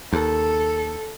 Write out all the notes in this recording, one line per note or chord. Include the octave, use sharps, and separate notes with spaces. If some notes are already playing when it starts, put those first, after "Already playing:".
D#2 A4